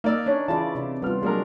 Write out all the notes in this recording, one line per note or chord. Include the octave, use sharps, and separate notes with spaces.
A#3 D#4 A#4 D5 D#5 E6
C#4 D4 C#5
C#3 E3 E4 F4 D5 A5
C3 D4 D5
G3 B3 F4 F6
F#3 G#3 A#3 D4 F#4 A#4